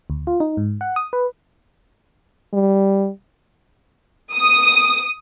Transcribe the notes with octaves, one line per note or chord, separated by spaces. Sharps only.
D2
F4
D#4
G#2
F#5
D#6
B4
G3
D#6